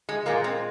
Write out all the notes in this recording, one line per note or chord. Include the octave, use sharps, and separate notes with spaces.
G#3
A#2 G#3 A#3
C4